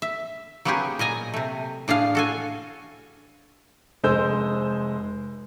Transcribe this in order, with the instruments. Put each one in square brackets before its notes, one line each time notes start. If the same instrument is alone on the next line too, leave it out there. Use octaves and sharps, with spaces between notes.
[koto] E5
F#3 A#3 B3 C#4 G4 G#4
A#2 D#5 G#5 A#5
C3 A3
A2 D4 G#4 F5
F#4 A4 G#5
[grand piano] F1 G#3 C5 E6 G6